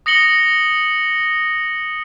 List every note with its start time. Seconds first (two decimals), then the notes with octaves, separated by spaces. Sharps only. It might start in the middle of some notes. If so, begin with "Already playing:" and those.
0.06 D#6 A#6 C#7 F#7 G7